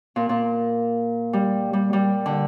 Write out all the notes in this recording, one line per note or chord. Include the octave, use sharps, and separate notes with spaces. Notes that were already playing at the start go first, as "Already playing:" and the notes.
A#2
A#2
G3
G3
G3
D3